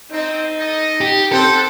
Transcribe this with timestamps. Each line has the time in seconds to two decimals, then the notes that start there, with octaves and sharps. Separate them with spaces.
0.12 C4 D#4
0.59 A4 D#5
1.01 G4
1.32 B3 C4 A4 F#5 G5